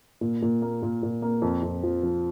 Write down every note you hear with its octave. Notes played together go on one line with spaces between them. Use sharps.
A#2
A#2
A#3
A#2
A#2
A#3
F2
F2
F3
F3